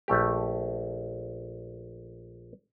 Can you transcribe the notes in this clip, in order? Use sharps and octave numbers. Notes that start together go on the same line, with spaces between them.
A#1 A3 G4